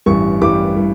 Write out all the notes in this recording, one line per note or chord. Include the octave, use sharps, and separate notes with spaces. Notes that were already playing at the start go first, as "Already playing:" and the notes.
A1 G2 E3 G3 C#6
A1 G2 E3 G3 D6
E3 G3